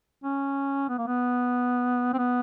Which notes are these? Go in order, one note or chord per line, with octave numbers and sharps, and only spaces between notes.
C#4
B3
A#3
B3
C4
B3